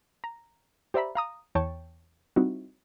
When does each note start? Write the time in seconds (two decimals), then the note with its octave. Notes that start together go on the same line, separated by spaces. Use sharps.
0.24 A#5
0.94 G4 C5 D5 E5 A#5 B5
1.15 F5 A#5 D#6
1.55 E2 C#5 G5 A5 C#6
2.36 G3 C4 D#4 E4 F#4